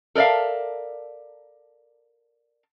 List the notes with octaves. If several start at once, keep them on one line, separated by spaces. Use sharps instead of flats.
A4 A#4 D5 E5 F5